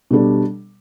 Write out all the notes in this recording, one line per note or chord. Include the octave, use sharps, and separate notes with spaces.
B2 G3 D4 A4